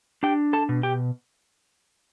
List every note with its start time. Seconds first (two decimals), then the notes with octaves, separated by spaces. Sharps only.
0.23 D4 G4 G5
0.53 A4 A5
0.69 B2
0.83 G4 G5